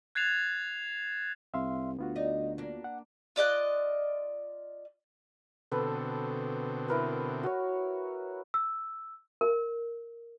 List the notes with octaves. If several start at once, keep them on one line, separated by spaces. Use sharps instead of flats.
F#6 G#6 A6 C7 E7 F7
C2 E5 F5 C6
D2 B3 F4 F#4
D#4 D5 D#5
A#3 D4
F#5
F4 D5 D#5 F#6
B2 D3 C4 A4 B4
E4 A#4 B4
F#4 C#5
E6
A#4